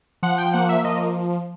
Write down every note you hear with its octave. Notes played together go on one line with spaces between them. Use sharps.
F3 F#5
G5
A#3 F#5
E5
F3 D#5